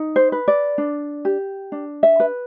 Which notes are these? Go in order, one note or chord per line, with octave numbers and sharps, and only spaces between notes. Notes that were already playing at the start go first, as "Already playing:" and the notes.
Already playing: D#4
C5
B4
D5
D4
G4
D4
E5
B4